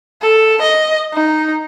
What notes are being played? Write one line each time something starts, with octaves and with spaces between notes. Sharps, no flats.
A4
D#5
D#4